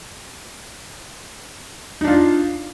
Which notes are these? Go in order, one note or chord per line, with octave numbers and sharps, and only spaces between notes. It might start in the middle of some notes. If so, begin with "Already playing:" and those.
D4 D#4 F4